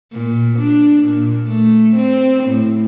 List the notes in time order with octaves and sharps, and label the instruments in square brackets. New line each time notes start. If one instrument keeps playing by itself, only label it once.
[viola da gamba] A#2
D4
A#2
A3
C4
A2